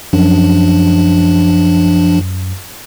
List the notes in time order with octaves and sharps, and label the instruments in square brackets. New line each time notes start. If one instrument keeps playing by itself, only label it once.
[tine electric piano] F#2 [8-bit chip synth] F3 D4